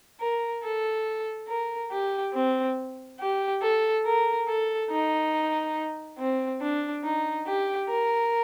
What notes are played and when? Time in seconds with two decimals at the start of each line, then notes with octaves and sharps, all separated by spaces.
0.20 A#4
0.63 A4
1.48 A#4
1.91 G4
2.34 C4
3.20 G4
3.62 A4
4.06 A#4
4.48 A4
4.90 D#4
6.19 C4
6.61 D4
7.04 D#4
7.47 G4
7.89 A#4